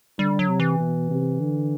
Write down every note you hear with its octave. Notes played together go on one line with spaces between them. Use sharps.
D3 G3
F#3
C3
E3
B2
C3
D3